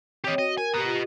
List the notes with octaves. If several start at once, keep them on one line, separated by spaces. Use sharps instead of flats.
C4 G4 C#5 D#5 G5
F#4 D#5
A#4 G#5
G4 B4 D#5 A#5
F4 G4